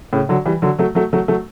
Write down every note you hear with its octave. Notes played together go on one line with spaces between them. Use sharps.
A2 C#3
D3 F#3
E3 G3
D3 F#3
F#3 A3
F#3 A3
F#3 A3
F#3 A3